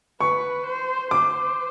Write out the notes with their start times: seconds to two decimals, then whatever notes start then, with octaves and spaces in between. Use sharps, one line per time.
0.21 B4 C#6
0.66 C5
1.11 C5 D6